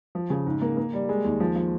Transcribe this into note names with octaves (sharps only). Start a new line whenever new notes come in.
F3
C#3
G#2
A#3
A#3
G3
G#3
D#2
F3
F3